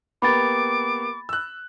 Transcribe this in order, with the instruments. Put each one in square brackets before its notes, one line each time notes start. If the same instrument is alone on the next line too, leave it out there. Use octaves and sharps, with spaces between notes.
[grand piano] A#3 B3 G4 [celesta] B5 A6 [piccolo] D6
[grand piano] E6 F#6